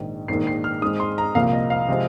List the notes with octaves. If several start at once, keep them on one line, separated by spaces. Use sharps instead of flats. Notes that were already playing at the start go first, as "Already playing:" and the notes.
Already playing: A#1 G#2 D#3
A#1 G#2 D#3 A#3 C7
C7
F6
G#2 G#3 C4 D#6
C6
A#5
C2 A#2 F3 A#3 F5
D#5
F5
C3 F3 G#3 C4